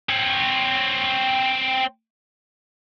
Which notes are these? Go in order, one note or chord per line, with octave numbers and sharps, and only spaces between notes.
C4 C#5